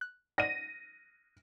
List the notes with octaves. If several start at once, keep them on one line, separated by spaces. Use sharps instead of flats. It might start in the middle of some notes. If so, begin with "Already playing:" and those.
F#6
D5 D#5 F#5 A#6 D#7